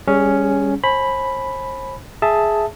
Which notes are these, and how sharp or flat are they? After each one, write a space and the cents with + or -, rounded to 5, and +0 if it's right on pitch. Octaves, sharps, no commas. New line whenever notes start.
G3 +25 C#4 +5 G#4 +0
C5 +40 G#5 +35 B5 +0
G#4 +10 E5 +0 A5 +0